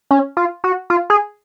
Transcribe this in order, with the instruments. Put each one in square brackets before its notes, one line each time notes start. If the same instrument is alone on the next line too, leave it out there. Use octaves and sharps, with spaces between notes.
[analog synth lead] C#4
F4
F#4
F4
G#4